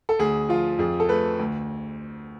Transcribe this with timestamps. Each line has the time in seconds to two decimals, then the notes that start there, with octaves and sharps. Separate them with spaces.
0.09 A4
0.19 D2 G#4
0.49 F3 F4
0.79 F2 G#4
1.00 A4
1.09 A3 B4
1.39 D2